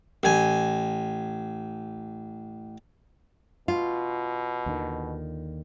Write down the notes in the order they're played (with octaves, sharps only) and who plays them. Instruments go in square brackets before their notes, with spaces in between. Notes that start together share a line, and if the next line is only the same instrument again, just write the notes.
[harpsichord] A1 G#5
[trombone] B2 [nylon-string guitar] F4
[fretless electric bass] D#2 D3 D#3